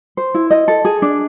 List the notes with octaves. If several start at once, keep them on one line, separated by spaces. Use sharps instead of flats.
C5
E4
D#5
A4
G#4
D4